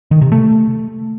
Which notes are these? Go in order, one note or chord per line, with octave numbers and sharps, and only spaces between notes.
D#3
C3
A3